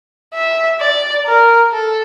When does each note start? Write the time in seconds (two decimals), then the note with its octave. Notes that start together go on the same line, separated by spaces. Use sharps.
0.34 E5
0.80 D5
1.26 A#4
1.72 A4